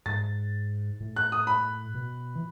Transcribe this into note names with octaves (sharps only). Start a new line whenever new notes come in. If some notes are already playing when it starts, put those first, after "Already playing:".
G#2 A6
A2
F#6
D#6
B5
B2
E3